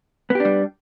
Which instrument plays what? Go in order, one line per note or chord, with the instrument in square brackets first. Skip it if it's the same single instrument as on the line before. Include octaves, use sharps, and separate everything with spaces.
[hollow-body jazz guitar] B3
G4
D4
G3